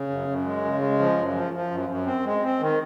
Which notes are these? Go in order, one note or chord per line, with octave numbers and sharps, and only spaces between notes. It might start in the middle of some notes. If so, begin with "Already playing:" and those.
Already playing: C#3
F#2
F#2
G#3
C#3
G#3
F3
F#2
F3
F3
F#2
F#2
C4
G#3
C4
D#3